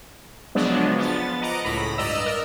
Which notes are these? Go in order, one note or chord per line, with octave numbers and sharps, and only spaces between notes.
C#3 F3 F#3 G#3 B3 D4
F3 B3 A6
D#5 F#5 A#5 D6
C#2 A2 B5 A#6
G2 D5 D#5 A#5 E6
A#4